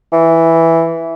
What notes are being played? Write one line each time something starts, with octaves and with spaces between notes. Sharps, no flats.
E3